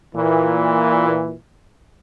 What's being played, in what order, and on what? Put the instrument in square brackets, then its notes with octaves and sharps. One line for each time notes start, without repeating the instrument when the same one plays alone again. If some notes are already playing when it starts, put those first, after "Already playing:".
[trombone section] A#2 E3